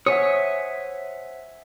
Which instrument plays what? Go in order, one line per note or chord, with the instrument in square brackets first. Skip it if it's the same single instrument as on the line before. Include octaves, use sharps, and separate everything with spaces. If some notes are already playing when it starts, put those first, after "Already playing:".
[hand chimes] C5 F#5 [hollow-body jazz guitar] C#5 [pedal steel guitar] E5 G#5 D#6